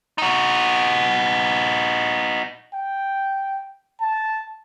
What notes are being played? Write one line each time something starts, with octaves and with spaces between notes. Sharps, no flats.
D#4 F#4
G5
A5